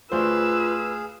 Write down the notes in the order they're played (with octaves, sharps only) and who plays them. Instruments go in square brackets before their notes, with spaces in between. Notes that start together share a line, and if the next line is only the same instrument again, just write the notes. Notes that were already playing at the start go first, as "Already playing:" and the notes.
[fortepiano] D2 C5 [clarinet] F4 [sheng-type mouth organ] G#4 F5 [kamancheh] B4 E6